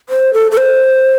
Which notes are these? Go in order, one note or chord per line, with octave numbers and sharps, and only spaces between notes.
C5
A4
A4
C5